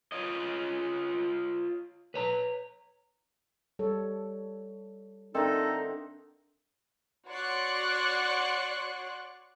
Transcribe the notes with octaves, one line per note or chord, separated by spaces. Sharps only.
F4 C#5 D#5
B4 C#5 A#5
G3 A4 C#5
D3 C4 D#4 A4 A#4 D#5 E5
F#4 C#5 D5 C6 C#6 F#6